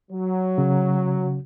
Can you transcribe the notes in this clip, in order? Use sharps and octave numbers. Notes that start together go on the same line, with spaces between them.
F#3
C#3